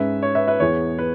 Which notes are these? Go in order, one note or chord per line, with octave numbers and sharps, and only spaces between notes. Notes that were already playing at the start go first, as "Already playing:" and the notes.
Already playing: G#2 G#3 C#4 B4 E5
C#5
B4 E5
B4 E5
E2 E3 B3 G#4 C#5
B4